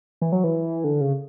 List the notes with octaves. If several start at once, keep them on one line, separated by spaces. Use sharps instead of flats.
E3
F#3
E3
D3
C#3